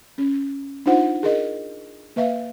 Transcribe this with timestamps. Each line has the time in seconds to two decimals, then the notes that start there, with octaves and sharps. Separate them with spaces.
0.18 C#4
0.86 D4 D#4 F4 C5 F#5
1.23 G#4 A#4 D#5
2.16 A#3 B4 E5 F5